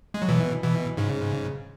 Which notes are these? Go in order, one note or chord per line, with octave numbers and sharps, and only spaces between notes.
G#3
F#3
B2 E3
B2 E3
G#2 C#3